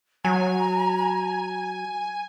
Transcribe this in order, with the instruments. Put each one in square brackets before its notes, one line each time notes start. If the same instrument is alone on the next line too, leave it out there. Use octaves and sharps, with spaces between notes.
[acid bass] F#3 [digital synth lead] G#5 [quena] A#5